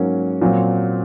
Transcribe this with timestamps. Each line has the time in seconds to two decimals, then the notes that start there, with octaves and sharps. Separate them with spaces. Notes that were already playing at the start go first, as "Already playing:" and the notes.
Already playing: G#2 F#3 A#3 C#4
0.41 A#2 F#3 C4